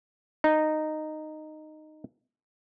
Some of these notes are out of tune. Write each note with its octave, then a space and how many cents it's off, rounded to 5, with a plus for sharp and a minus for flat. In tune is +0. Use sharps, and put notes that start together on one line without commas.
D#4 -10